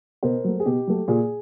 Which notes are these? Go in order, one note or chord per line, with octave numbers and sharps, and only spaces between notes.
B2 A#4 C5
F#3 A3
G#4
B2 G4
F#3 A3
A#2 G#4